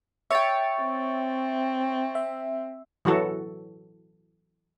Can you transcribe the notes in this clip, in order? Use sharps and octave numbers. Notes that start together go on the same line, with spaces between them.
C#5 E5 G5 C#6 A6
C4
E5
E3 F#3 F#4 A4